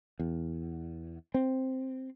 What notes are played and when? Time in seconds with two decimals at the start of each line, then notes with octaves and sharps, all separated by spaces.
0.19 E2
1.34 C4